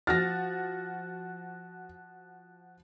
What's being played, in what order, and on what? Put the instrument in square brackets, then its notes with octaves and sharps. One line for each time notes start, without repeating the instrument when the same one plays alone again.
[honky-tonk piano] F3 F#4 A6 [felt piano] F6 A#6